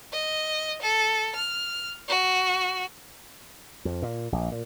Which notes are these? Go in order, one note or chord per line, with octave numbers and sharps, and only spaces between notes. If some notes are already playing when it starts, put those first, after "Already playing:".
D#5
A4
F6
F#4
F2
A#2
A#1
A#2